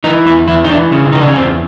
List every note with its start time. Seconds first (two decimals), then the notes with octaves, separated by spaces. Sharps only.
0.04 E3 D#4
0.26 E2 E4
0.48 E2 E4
0.64 D#4
0.70 E3 D4
0.91 C#3 C#4
1.05 E4
1.13 C#3 D#4
1.20 D4
1.28 C#4
1.35 E2 C4